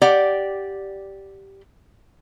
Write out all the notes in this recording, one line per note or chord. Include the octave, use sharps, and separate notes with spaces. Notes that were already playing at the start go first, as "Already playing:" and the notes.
G4 D5 F#5